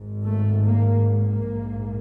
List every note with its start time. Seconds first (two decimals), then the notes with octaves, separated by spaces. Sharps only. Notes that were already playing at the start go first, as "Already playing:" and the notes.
Already playing: G#1 G#2
0.25 A3
0.66 A#3
1.06 A#3
1.47 A#1 G#2